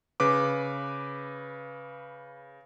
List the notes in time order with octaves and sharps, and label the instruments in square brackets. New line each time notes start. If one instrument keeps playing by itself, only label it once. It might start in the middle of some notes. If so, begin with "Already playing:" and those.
[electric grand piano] C#3 B4 D6